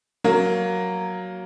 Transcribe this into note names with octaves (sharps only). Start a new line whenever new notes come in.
F#3 A#3